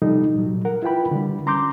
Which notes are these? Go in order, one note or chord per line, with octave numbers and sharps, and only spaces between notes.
C3 F3 G3 D#4 A4
A#2 F#3
A#4 F#5
E4 F4 B4 G5 B5
D3 G3
C#4 A#5 C6 D6 G6